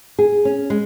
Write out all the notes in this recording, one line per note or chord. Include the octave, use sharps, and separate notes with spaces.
G#4
C#4
G#3